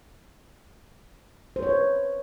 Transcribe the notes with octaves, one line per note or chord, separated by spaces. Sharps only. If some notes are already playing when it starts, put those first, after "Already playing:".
C5
C#5
B4